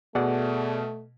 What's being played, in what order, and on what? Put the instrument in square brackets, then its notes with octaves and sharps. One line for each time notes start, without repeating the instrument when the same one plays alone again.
[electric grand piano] B2 [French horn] A3 [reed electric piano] G#4 D5 F#5